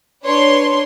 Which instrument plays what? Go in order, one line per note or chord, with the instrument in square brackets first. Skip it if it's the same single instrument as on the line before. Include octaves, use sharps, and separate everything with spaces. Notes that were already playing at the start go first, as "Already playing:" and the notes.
[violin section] D4 B4 C#5 C6